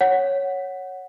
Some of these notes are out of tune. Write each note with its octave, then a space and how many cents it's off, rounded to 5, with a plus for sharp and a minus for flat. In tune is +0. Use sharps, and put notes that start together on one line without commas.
C#5 +0 F#5 +0